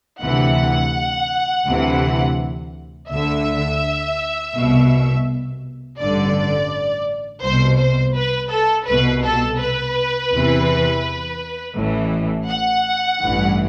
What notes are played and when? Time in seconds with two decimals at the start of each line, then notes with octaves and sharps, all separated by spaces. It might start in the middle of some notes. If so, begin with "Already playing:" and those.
0.22 D2 C3 E3 F#5
1.67 D2 C3 E3
3.10 D2 D3 E5
4.55 C2 B2
5.99 A1 G2 D3 D5
7.43 C2 B2 C5
7.79 C5
8.15 B4
8.52 A4
8.87 C2 B2 B4
9.24 A4
9.60 B4
10.32 E2 C3 E3
11.76 A1 A2 E3
12.48 F#5
13.20 A1 G2 E3